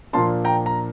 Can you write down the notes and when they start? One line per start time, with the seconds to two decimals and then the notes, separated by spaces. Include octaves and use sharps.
0.13 A#2 F3 A#3 D4 A5 C6
0.45 G5 A#5
0.66 A#5